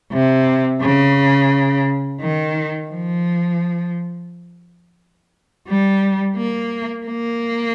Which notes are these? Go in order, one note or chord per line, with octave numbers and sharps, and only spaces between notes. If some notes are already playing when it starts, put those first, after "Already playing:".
C3
C#3
D#3
F3
G3
A#3
A#3